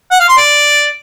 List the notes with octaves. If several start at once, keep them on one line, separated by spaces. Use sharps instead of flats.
F#5
F5
C6
D5